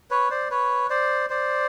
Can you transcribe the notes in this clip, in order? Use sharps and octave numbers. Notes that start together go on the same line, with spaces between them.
B4 C#5
C5 D5
B4 C#5
C5 D5
C5 D5